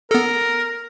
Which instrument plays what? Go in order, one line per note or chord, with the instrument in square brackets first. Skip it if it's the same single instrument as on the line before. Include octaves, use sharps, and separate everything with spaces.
[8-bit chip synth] B3 A4 [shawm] A#4